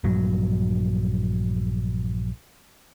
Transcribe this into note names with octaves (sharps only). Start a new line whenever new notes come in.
A#1 G2 F#3